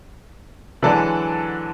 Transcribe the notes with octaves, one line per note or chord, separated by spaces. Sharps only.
D3 E3 F#3 G#3 A4 D5